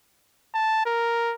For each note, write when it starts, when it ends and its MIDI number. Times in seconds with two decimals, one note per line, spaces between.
0.54 0.84 81
0.86 1.34 70